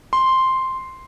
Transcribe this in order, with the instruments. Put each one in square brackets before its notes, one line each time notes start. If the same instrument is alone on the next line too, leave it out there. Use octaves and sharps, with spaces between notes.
[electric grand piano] C6